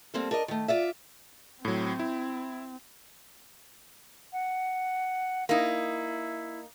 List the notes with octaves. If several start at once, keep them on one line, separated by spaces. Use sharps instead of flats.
G3 A#3 C4 A4
D4 A#4 D#5
D#3 A3
F4 D5 E5
A2 F#3 C4
E4
F#5
A#3 D#4 E4